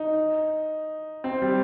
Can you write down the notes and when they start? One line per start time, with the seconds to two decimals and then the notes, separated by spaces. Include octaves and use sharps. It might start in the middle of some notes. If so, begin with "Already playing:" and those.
Already playing: D#4
1.24 C4
1.42 G3